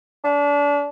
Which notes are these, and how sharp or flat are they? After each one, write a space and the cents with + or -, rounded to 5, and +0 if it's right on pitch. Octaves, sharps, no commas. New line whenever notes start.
D4 -30